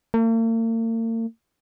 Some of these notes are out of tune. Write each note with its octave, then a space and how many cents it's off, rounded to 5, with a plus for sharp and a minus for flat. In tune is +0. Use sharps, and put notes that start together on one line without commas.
A#3 -45